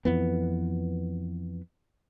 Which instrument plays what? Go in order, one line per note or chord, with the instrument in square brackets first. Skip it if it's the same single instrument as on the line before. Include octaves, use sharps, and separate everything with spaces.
[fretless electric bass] F2 E3 B3